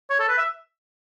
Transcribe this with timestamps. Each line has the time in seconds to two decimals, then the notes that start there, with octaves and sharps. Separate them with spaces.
0.10 C#5
0.20 A4
0.29 B4
0.38 E5